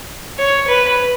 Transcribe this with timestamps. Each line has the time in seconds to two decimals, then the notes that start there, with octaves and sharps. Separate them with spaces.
0.38 C#5
0.68 B4